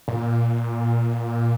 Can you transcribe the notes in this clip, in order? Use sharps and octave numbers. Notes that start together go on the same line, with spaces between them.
A#2